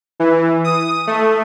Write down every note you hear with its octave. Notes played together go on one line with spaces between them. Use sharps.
E3
D#6
A3